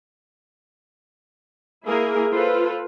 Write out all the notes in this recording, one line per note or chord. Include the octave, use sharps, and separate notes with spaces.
A#3 E4 G#4 A#4
F4 A4 B4 C5 F5